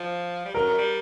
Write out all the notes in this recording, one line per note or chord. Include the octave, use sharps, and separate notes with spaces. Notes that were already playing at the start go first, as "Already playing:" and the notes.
Already playing: F3
G3
F#3 A#4
G3